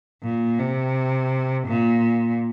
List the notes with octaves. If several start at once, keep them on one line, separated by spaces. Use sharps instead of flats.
A#2
C3
A#2